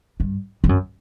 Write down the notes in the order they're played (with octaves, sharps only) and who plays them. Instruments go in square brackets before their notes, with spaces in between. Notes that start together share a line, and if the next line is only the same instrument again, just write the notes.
[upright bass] G2
G2
F#2